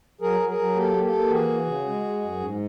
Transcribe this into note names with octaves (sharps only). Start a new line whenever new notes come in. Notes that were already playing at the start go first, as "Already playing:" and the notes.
F#3 G#4 A#4
F#3
G#4 A#4
F#3
A#3 G4 A4
A#3
G4 A4
A#3
E3 F#4 G#4
E3
C#3
G#3
G#3
F#2
G#2